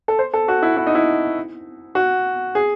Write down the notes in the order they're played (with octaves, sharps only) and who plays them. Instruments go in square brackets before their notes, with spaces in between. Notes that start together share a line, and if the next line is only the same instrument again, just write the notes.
[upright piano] A4
C5
A4
F#4
E4
E4
D#4
E4
F#4
G#4